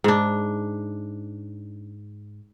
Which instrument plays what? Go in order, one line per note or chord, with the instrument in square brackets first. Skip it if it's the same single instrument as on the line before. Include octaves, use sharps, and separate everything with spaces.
[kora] G#2 D4